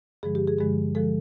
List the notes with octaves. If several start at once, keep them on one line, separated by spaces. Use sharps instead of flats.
G2 D3 F3 G#3 G#4
G4
G#4
G2 D3 F3 G#3 G#4
D3 F3 G#3 A4